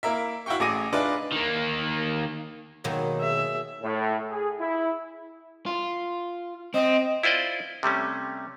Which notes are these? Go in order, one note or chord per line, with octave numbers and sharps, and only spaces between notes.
A#3 E4 A#4 E5
E4 F#4 F5 G5 C#6
A1 G#4 D6 A#6 D#7
D4 D#4 F4 G#4 B4 E5
D#3 A#3
D#2 B2 D#3 F#3 G#3 A#3
G#4 E5
A2
G#4
E4
F4
C4 D#5
E4 F4 C5 D5 D#5
C3 G3 A3 C#4